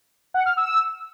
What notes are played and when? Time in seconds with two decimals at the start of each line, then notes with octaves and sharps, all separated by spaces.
0.34 F#5
0.46 F6
0.57 E6